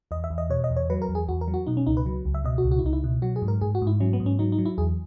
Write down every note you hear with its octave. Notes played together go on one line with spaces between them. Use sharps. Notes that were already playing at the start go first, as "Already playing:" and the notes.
E2 D#5
E5
E2
D#5
B2 C#5
D#5
E2
C#5
F#3 B4
A#4
E2
G#4
E2 F#4
A#4
F#3
F#4
B2 D#4
C#4
C#2 D#4
B4
F#3
C#2
E5
B2 D#5
F#4
C#2
F#4
E4
C#2 D#4
E4
B2
F#3 F#4
G#4
G#2
A#4
G#2 G#4
F#4
G#2
E4
F#3 C#4
B3
G#2
C#4
F#3 D#4
D#4
F#3
E4
E2 G#4